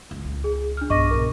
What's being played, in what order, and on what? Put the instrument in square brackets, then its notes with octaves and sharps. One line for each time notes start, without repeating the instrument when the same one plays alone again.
[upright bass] C#2
C#2
[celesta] G#4
D4 F6
[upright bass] B1 [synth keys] G2 D#5 D#7 [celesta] C#6 D6 A#6
[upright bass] B2 E3 [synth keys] A#4